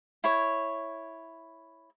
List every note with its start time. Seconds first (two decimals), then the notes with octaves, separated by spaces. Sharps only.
0.24 E4 C#5